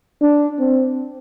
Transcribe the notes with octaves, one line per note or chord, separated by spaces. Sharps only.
D4
C4